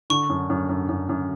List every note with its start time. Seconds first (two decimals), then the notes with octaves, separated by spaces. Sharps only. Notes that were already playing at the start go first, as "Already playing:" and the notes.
0.10 D3 C#6
0.30 F#2
0.50 F#2
0.69 F#2
0.89 F#2
1.09 F#2